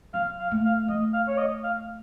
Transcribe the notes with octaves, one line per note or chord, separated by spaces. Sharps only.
F#3 F5
F5
A3
F5
A3 D#5
F5
C#5
D#5
F5